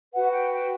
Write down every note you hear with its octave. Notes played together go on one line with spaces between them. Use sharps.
F#4 B4 F#5
G5
G5